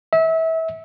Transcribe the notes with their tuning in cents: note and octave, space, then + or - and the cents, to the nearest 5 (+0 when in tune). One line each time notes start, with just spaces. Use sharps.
E5 -30